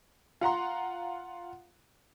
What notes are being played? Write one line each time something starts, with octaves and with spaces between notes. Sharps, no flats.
F4 F#5 A#5 C6